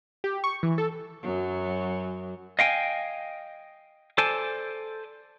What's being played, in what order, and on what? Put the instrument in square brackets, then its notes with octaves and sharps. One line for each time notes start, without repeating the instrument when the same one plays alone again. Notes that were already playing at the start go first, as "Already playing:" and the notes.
[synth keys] G4
C#6
E3
A4
[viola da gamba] F#2 F#3
[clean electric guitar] D#5 F5 G5 G#5
A4 C5 D5 G#5 A5